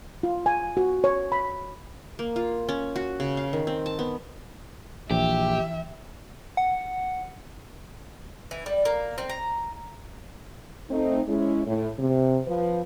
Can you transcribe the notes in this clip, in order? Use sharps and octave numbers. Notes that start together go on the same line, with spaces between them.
F4
G#5
F#4
C#5
B5
A#3
F4
C#4
F#4
C#3
F5
D#3
C4
A5
B3
A#1 E3 G4 E5
F#5
E3
G3
A#3
C4
A#5
A3 C4 D#4
G#3 C#4 E4
A2
C3
F3 B4